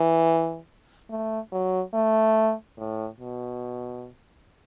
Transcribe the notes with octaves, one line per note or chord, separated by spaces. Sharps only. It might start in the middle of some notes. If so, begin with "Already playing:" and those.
Already playing: E3
A3
F#3
A3
A2
B2